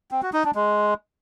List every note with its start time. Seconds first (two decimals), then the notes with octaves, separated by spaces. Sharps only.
0.12 C4
0.22 F#4
0.33 D#4
0.44 D4
0.55 G#3